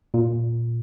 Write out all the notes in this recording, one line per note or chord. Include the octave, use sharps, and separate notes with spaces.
A#2